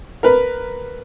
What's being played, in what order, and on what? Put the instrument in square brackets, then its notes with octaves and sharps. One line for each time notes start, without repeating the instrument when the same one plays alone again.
[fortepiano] A#4 B4